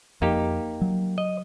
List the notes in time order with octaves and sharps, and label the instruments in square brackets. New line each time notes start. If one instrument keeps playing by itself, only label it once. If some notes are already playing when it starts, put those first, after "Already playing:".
[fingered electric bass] F2 [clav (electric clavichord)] A#3 D#4 G4
[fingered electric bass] F#3
[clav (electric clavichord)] D#5